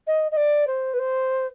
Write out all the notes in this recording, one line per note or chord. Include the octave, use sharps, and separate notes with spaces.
D#5
D#5
D5
C5
B4
C5